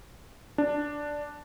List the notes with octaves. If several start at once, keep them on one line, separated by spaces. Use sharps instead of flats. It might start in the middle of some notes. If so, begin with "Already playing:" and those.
D4